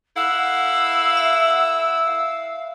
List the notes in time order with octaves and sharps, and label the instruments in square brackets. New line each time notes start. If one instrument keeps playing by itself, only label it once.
[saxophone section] E4 A4 F#5 [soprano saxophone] F5 [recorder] E6
[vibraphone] E5
[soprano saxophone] F5